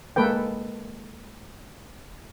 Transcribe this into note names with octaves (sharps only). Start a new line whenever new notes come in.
G#3 A#3 A4 B4 G5